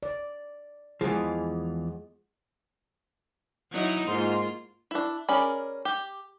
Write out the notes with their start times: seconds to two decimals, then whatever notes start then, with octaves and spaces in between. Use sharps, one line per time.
0.03 D5
1.01 E2 E3 F3 G#3 G#4
3.71 F#3 D#4 E4
4.07 G#2 A#3 F4 C6
4.91 D4 E4
5.29 C#4 G#4 A#4 D5 B5
5.85 G4